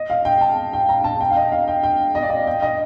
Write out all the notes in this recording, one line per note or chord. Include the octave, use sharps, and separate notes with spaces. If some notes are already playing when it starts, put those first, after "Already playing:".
Already playing: D#5
F5
G5
A5
G5
A#5
A5
G5
F5
D#5
F5
G5
G5
D#5
D5
D#5
G5
D#5